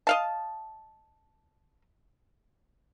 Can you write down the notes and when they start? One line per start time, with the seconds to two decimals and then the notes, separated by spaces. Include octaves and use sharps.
0.07 D#5 F5 A5